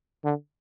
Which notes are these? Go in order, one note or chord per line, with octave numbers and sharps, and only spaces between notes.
D3